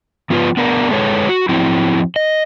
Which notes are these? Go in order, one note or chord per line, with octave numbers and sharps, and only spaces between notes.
F3 B3 F4 B4
B3 D4 A#4
G#3 A4 B4 C#5
F#4
F3 F#3 C4 E4
D#5